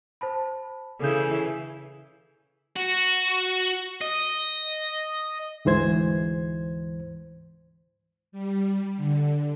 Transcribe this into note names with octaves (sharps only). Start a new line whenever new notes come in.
C5 A5 B5
C#3 E3 A4 G6
F#4
D#5
D2 G#2 E3 C5 G#6
G3
D3